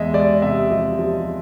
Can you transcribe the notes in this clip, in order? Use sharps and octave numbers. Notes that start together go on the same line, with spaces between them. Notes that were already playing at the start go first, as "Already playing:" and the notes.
Already playing: E2 G#3 D#5 E5
G#3 D5
C3 E5
F3 D#5
F3